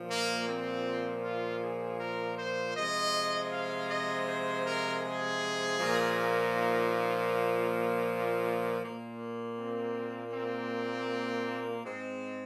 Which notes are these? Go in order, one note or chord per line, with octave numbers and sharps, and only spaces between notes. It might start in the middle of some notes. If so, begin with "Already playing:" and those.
Already playing: A#2 F3
A#3
C4
F4
G#4
A#4
C5
C3 F3 G#3 D#5
F5
D#5
C5
A#4
G#4
A#2 F3 A#3
D#4
A#3
A#2 A#3
C4
C4
G#2 G#3 C4